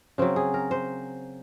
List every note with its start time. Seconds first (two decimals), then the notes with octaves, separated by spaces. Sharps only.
0.18 C#3 F#3 C4
0.36 G#4
0.54 A#4
0.71 C5